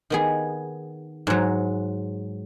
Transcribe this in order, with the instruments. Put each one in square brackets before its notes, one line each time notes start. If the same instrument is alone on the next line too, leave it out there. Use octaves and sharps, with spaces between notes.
[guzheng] D#3 B3 G#4
G#2 F#3